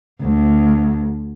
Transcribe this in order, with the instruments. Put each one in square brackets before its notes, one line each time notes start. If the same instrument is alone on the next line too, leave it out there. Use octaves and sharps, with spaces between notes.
[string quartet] D2